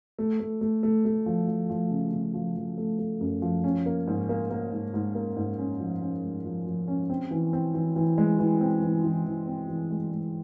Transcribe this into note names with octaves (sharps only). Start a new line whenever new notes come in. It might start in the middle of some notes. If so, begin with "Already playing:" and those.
A3
A3
A3
A3
A3
F3
F3
F3
C#3
C#3
F3
F3
A3
A3
F#2
F3
C#4
A#3
G#2
A#3
A#3
G#2
G#2
A#3
G#2
C#4
F3
C#4
G#2
F3
F3
C#4
C4
E3
C4
E3
E3
G#3
E3
C4
E3
E3
E3
C4
E3
G#3
G#3